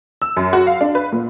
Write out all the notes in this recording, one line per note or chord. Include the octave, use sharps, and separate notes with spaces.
E6
F#2
F#4
F5
D4
B4
A#2